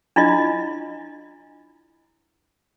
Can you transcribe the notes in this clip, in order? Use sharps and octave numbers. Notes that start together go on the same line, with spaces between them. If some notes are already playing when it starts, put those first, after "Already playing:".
D4 E4 F4 D#5